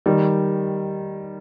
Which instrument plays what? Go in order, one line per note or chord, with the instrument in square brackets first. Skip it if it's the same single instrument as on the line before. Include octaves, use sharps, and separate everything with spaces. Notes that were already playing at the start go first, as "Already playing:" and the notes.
[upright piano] D#3 G3